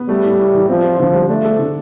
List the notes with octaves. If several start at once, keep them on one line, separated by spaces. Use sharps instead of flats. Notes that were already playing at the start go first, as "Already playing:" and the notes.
Already playing: B3
G3 A3
A2
A2
E3
F3 C4
F4
D3 F3
G3
A3 D4
A4
D3